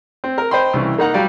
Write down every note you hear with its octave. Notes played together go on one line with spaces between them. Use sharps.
C4
A#4
C5 D#5 G5 B5 C6
C2 C#3 E3
A#3 D#4 F#5 A#5
F#3 G3 D5 F5